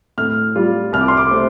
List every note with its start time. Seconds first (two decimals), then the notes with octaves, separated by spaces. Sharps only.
0.18 A2 F6
0.55 G3 F4
0.93 C2 F6
1.01 D6
1.08 C6
1.17 D6
1.31 C3 A3 C4